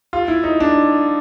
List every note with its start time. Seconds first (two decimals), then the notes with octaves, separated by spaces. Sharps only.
0.13 F4
0.28 E4
0.44 D#4
0.60 D4